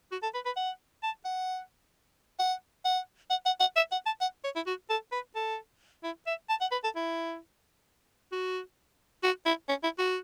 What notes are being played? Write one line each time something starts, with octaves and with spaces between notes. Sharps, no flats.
F#4
A4
B4
B4
F#5
A5
F#5
F#5
F#5
F#5
F#5
F#5
E5
F#5
A5
F#5
C#5
E4
F#4
A4
B4
A4
E4
E5
A5
F#5
B4
A4
E4
F#4
F#4
E4
C#4
E4
F#4